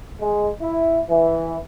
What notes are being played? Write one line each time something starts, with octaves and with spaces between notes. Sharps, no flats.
G#3
E4
E3